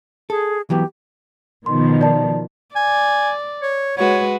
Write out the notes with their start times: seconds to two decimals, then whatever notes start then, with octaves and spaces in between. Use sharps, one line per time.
0.30 G#4 A4
0.70 E3 F#3 B3 G4
1.66 B2 D#3 F3 C6
2.01 D5 A5
2.76 D5 G#5
3.62 C#5
3.98 G#3 F#4 B4 C#5